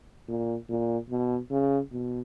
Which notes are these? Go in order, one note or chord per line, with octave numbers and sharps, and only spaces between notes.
A#2
A#2
B2
C#3
B2